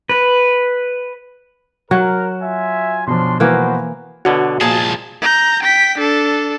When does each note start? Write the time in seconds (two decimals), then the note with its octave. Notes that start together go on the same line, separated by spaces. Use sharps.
0.09 B4
1.91 F#3 F#4 A#4
2.42 F4 E5 G#5
3.07 B2 F3 C#4 D4 C6
3.40 E3 A#3 B3 F#4 C5
4.25 B2 D3 F#4 C#5
4.61 C2 A#2 F3 G#3 G#4 A5
5.22 A#5 G6
5.63 G5 B6
5.98 D4 A4